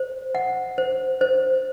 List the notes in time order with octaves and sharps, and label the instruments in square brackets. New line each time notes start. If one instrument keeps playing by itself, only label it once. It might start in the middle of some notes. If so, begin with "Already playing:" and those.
Already playing: [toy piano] C5
F#5
C5
C5